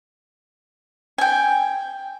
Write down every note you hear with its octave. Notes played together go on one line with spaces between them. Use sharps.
G5 G#5